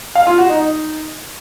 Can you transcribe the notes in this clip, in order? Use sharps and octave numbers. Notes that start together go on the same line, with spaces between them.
F5
F4
F#4
D#4
D#4